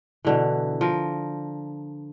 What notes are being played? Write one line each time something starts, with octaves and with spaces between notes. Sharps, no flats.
B2 D3 E3
F3 A#4